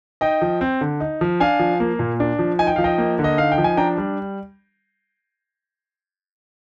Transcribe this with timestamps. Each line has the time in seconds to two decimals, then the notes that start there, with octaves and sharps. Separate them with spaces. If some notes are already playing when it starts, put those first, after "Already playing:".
0.21 D#4 D#5 G5
0.42 F3
0.61 C4
0.81 D3
1.00 D#4
1.21 F3
1.40 D4 F5 G#5
1.59 F3
1.80 A#3
1.99 A#2
2.20 D4
2.39 F3
2.59 D#4 G#5
2.67 G5
2.76 F3 F5
2.84 D#5 G5
2.98 A#3
3.19 D3
3.24 D#5
3.37 D#4 F5
3.52 G5
3.58 F3
3.64 G#5
3.77 D4 G5 A#5
3.98 G3